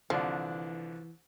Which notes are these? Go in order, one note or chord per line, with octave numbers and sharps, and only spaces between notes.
C2 D3 E3 F3 D4